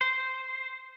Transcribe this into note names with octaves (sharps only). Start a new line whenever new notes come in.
C5